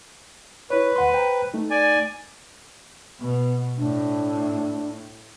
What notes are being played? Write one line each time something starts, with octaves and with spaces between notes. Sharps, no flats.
E4 B4 C#5
D#2 F#5 C6
C5 G5 A#5
A3 D#4
D5 G#5
B2 B3
A2 D4